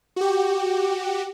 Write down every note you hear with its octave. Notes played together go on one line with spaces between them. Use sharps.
F#4 G4